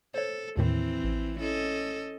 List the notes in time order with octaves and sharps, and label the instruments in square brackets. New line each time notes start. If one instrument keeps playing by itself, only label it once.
[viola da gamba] A4 [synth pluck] C5 C#5
[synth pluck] D#2 A2 D#3 [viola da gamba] E3 C4
[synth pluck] A1
[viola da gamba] C#4 A4 D#5